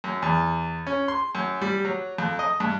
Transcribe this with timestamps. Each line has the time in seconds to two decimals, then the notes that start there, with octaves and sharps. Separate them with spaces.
0.04 F#2
0.22 E2
0.87 C#4
1.08 C6
1.35 F#2
1.62 G3
1.85 F#3
2.18 F2
2.39 D#5
2.60 G2